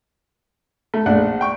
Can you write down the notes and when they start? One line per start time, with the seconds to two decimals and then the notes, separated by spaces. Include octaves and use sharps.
0.94 A3
1.06 A#1 A3 D4 F#5
1.41 G5 C#6